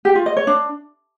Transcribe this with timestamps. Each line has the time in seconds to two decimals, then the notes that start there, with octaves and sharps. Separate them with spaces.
0.05 G4
0.15 F4
0.26 D#5
0.37 C#5
0.47 D4